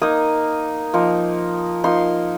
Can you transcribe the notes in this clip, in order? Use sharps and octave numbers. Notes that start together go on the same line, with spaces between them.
A#3 D#4 D#6
F3 A#3 D#4
F3 A#3 D#4 C6